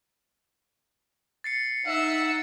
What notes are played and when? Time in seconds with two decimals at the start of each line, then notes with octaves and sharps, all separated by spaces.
1.44 A6 C7 C#7
1.87 D#4 E5 F#5 E6